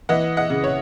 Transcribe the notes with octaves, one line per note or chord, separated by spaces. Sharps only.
E3 D#5 F#5
D#5 F#5
C#3
C#5